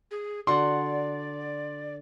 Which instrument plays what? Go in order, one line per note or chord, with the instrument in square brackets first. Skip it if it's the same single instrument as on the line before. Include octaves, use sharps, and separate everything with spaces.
[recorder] G#4
[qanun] D3 F#4 F#5 [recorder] D5 [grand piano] C6